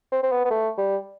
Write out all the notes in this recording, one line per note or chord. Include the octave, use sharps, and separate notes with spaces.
C4
C4
B3
B3
A3
G3